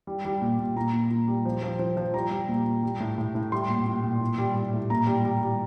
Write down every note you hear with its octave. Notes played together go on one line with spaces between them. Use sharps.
G3
G3
A#2
A#2
A#2 A#5
A#2
A#2
G3
F3
F3
F3
F3
G3 A#5
G3
A#2
A#2
G3
A2
A2
A2
G3 C6
A#2
A#2
A#2
A2
G3
G3
A2
A#2 A#5
G3
G3
G3